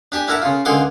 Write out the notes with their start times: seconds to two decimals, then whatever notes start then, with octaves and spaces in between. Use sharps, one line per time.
0.12 D4 G4 G#5
0.28 D4 E4 A#4 F#5 A5
0.42 C#3 F4
0.65 C#2 D3 G#4 F#5 C6 D6